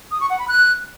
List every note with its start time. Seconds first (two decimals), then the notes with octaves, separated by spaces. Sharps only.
0.11 D#6
0.20 C#6
0.30 F#5
0.39 B5
0.48 F#6